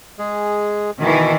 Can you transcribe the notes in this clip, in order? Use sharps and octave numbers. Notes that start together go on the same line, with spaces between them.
G#3 G#4
B2 D#3 E3